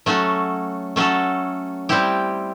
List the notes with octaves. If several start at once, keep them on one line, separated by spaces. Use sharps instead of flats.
F#3 A3 C#4 F#4 A4
F#3 A3 C#4 F#4 A4
G3 C4 E4 G4